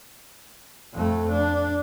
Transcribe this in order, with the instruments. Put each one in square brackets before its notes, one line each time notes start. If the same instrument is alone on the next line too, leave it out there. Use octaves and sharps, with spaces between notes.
[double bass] F2 A3
D4